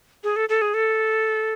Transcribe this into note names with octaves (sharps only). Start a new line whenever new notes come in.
G#4
A4
A4
G#4
A4